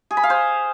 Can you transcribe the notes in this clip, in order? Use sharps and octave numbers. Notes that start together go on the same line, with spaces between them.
G#4
B5
F5
C5